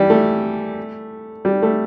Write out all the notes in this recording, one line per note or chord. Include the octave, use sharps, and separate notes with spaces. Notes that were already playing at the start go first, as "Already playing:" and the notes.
Already playing: E3 G3
A3
G3
A3